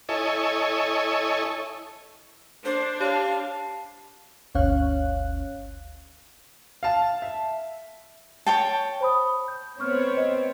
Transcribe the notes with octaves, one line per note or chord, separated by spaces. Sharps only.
E4 A4 C#5 D#5 G#5
D4 C5
G4 C#5 F5 A5
G1 D2 C#4 C#5 F5 F#6
F5 A5
E5
C#5 G5 A5
C5 B5 D#6
G6
B3 C4 C#5 C#6 F6
C5 D#5